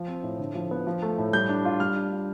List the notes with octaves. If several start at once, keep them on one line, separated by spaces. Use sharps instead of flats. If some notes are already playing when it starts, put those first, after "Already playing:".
Already playing: F3
C4
A2
D3
F3
B3
F3
A3
A2
G3 G6
D4
F4
G3 F6
D4
F4